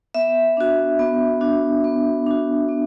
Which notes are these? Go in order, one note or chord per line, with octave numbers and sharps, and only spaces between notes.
B3 E5
D4 F#4
B3
D4 F#4
B3
D4 F#4
B3